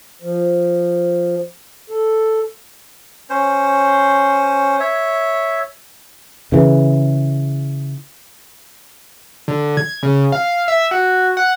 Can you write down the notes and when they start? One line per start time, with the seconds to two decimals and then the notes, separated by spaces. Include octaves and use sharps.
0.22 F3
1.90 A4
3.30 C#4 C5
4.80 C#5 E5
6.52 C#3 E3
9.48 D3
9.77 G#6
10.03 C#3
10.32 F5
10.68 E5
10.91 F#4
11.37 F#5